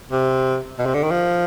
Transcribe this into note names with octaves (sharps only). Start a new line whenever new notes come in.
C3
B2
C3
D3
D#3
F3